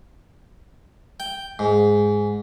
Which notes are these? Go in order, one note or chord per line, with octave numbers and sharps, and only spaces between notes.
G5
G#2